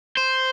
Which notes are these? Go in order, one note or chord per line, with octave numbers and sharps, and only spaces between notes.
C5